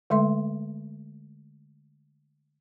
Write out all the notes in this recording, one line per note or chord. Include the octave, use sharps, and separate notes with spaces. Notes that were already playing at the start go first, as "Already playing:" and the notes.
D3 G#3 A3 A4 E5 C6